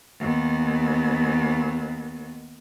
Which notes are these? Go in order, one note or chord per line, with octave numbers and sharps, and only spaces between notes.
D#2 B3